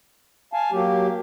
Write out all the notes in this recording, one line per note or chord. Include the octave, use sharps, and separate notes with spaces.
F5 G#5 A5
F#3 A#3 G4